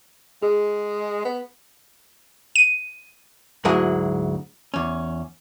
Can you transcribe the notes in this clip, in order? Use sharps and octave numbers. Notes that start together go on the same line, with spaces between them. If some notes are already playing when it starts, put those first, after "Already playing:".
G#3 G#4
B3
D#7
D2 G#2 F#3 G#3 E4 G#5
E2 C#4